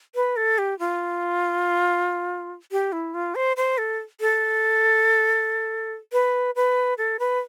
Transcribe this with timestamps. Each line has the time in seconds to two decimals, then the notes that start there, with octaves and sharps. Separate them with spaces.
0.15 B4
0.36 A4
0.58 G4
0.79 F4
2.72 G4
2.92 E4
3.14 F4
3.35 C5
3.57 C5
3.78 A4
4.21 A4
6.12 B4
6.56 B4
6.98 A4
7.19 B4